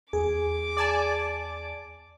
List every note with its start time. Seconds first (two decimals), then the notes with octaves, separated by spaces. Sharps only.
0.13 E2 G#4 D6
0.77 D5 G#5 A5